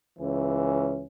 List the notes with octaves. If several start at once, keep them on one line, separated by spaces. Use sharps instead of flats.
C#2 E3 C#4